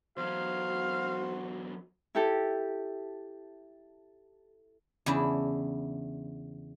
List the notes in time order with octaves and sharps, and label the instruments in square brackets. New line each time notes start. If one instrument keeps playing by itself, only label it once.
[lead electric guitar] E2 F#3 [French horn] F#4 [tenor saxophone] C5 [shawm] F5
[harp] E4 G4 A4
[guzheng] E2 C#3 D4 E4